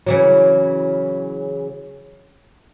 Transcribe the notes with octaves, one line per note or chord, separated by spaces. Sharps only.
C#3 E3 F#3